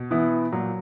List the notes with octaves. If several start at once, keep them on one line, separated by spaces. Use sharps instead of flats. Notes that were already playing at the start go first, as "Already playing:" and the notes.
Already playing: B2
E3 B3 E4
A#2 F#3